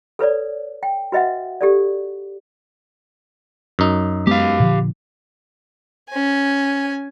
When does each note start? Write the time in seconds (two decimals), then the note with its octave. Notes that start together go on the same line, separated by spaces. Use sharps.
0.19 A4 B4 C#5 D5
0.83 G5
1.12 F#4 B4 D#5 E5 F#5
1.61 G4 A4 D5
3.79 F#2 D#4
4.27 G#3 B3 G4 F5
4.60 A#2 D3 F3
6.10 C#4 G#5